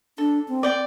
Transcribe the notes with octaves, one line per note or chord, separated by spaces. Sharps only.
D4 A4
C4
D5 G5